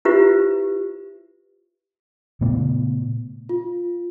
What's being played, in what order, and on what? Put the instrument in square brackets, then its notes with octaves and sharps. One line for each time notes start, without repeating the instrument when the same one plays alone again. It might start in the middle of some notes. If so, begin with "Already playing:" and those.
[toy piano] E4 F4 G4 B4 C5 E5
[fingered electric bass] A#2 C#3 A3 B3
[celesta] F4